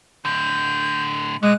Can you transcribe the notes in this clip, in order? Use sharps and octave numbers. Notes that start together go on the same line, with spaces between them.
A2 D3 G6
A#2 G#3 F#6